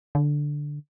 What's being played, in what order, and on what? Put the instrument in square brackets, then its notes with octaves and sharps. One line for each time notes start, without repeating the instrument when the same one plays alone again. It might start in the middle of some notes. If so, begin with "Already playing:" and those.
[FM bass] D3